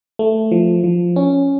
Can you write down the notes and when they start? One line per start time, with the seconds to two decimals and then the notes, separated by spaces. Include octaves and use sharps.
0.19 A3
0.51 F3
0.84 F3
1.16 C#4